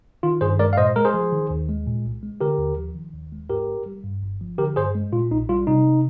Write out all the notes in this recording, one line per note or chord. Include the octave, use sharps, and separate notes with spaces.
D#3 F4
G2 G#4 C5
G#3 A#4 D5
F5
A#2 C5 D#5
G#3 A#4
G#4 C5
F3
D#3
D#2
G#3
A#2
C2
G#3
D3 G4 A#4
D#2
F3
D#3
D#2
G#3
G#2 G4 A#4
G#1
G3
G2
G1
F3
D3 G4 A#4
G2 G#4 C5
G#3
A#2 F4
A#1 D#4
G3 F4
C3 D#4